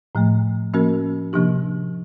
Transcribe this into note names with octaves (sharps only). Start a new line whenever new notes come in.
A2 F3 A3
F3 A#3 C#4 F#4 A#4
C3 F3 A#3 D4 G4